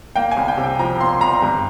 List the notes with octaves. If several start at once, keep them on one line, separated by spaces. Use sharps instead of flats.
A#3 G5
G#5
C2
G5
C3
G5
F3 A#5
A#3 C6
C2 A#5
G2